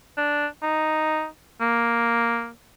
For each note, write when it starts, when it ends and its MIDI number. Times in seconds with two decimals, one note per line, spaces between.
0.17 0.47 62
0.62 1.26 63
1.61 2.49 58